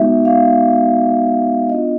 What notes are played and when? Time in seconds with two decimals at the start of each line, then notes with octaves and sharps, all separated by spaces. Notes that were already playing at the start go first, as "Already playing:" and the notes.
Already playing: G#3 B3 D#4 F#4 E5
0.25 F5
1.69 B3 D4 F4 D#5